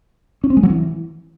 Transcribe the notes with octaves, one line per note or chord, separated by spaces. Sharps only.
C#4
C4
G#3
F#3
E3